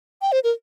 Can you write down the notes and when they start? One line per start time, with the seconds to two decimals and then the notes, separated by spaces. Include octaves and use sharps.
0.22 G5
0.32 C5
0.44 A#4